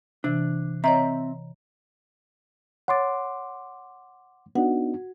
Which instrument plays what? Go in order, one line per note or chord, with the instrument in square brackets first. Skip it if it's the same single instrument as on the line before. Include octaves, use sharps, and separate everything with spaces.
[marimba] C3 E3 [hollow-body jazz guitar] D4
[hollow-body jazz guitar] C4 E5 [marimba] C#5 D#5 A#5
[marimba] C#5 A6 [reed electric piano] F#5 C6 D6
[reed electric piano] B3 D4 D#4 [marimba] F#4 F#5